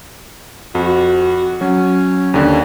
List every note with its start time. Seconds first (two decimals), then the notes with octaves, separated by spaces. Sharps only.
0.75 F2 F#4
1.61 F#3 C#4
2.34 D#2 D3